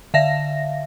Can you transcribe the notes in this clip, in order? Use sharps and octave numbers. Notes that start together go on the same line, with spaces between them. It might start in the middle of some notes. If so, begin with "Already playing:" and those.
D3 E5 F5 A#6